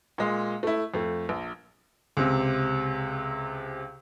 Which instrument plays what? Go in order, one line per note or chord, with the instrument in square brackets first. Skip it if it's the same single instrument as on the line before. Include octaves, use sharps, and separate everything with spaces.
[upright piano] A#2 G#3
A3 E4
F2 A3
A#1
C#2 C3